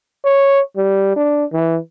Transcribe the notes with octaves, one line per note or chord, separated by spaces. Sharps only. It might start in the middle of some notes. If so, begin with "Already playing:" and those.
C#5
G3
D4
E3